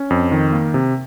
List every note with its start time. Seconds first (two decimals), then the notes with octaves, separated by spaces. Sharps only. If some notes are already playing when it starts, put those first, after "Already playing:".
Already playing: C#4
0.10 F2
0.32 D#3
0.53 A#3
0.74 C3